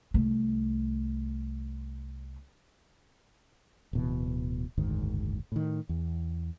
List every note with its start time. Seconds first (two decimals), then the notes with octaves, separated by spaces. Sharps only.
0.14 C2 A3
3.93 D1 B2 E3
4.77 F#1 D2 G#2 D#3
5.52 A2 D#3
5.89 E2